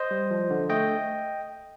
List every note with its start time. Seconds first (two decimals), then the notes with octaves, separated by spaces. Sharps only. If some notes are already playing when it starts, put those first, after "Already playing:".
Already playing: C5 D#5
0.11 G3
0.31 F3
0.50 D3
0.69 A3 D#5 G5